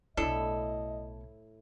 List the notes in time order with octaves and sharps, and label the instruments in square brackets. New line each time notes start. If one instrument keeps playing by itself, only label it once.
[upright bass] B1 A3 [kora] A2 E4 [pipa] D4 A4 [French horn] D#5